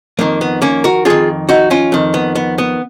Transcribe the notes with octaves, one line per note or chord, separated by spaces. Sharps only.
F2 D#3 A#3
B3
A#3 C#4
F#4 A#4
F2 D#3 F4 G#4
D#4 F#4
C#4 F4
F2 D#3
B3
B3
B3